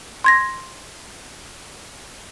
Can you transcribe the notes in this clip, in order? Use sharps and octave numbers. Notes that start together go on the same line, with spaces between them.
C6 G#6 A#6